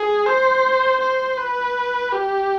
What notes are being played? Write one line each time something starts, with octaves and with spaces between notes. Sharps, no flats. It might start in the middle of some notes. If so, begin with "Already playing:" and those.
Already playing: G#4
C5
C5
B4
G4